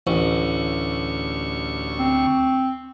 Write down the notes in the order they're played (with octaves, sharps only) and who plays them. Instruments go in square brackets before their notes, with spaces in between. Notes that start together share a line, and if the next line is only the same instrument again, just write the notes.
[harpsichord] A1 [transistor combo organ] D2 C#6
[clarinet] C4